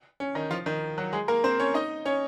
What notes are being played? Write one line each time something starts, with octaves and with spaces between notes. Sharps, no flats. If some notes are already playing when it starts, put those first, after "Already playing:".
C#4
D#3 D#4
F3 F4
D#3 D#4
F#3 F#4
G#3 G#4
A#3 A#4
C4 C5
C#4 C#5
D#4 D#5
C#4 C#5